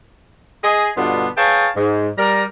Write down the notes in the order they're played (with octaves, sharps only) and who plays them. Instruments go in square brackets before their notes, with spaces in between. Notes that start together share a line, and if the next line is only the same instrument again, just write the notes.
[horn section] G#4 D#5
G2 B2 D3 B3 F4 C6
G#4 B4 C#5 F5 G5 A5
G#2
G3 A#4 A#5